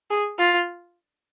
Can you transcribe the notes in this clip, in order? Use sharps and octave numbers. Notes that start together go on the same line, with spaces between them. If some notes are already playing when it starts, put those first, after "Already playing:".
G#4
F4